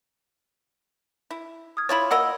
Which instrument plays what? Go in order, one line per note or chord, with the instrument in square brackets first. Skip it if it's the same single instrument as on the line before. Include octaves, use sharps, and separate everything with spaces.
[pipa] E4
[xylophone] D#6 F6 G#6
[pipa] E4 F4 C#5 [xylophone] B5 G#6 A6
[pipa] A#3 A#4 D#5 [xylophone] F#5 E6